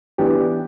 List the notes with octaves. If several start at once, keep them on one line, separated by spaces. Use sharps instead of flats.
E3 B3 D4 G4